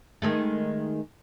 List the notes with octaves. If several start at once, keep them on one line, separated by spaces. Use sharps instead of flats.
D#3 G#3 A3